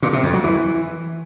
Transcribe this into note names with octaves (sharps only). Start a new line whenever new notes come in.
A#2
C3
F2
F#3
E3